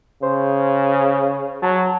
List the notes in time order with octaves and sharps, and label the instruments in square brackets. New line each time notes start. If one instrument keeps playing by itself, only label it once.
[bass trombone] C#3 [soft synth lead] C5
[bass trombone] F#3 [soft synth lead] A5